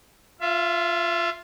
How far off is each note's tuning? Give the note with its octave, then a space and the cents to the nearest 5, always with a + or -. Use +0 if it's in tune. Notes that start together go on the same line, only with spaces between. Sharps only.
F4 +0 E5 +35